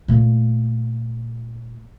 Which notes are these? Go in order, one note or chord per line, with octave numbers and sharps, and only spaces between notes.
A#2 A3